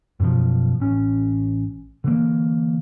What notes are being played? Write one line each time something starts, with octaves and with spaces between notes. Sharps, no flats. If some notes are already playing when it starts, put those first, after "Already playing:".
F#2 B2 F3
A1 C#4
D3 E3 A#3